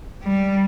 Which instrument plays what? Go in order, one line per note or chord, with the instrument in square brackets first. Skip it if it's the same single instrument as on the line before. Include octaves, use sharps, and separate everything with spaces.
[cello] G3